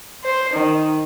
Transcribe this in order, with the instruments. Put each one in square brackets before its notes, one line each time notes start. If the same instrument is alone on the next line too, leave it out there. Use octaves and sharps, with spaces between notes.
[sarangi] C5
D#3